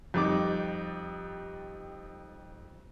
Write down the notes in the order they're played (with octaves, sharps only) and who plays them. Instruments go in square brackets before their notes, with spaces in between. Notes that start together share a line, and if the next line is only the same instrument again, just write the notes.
[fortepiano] F2 G3 D#4 D6